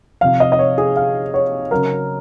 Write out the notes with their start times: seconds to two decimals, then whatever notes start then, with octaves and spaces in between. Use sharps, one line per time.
0.21 C3 F3 F5
0.40 D#5
0.52 D#5
0.59 C#5
0.78 G#4
0.97 F5
1.34 C#5
1.71 C#3 F#3 A#4